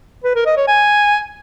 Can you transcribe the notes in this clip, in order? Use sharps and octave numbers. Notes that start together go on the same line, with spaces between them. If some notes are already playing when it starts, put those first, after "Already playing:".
B4
A#4
D#5
C#5
G#5